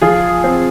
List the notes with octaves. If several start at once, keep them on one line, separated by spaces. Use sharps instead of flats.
F3 F4 G#4
C4